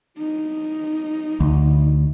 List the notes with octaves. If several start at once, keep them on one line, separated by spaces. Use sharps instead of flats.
D#4
D2